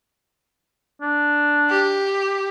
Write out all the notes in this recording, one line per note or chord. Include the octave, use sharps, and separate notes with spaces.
D4
G4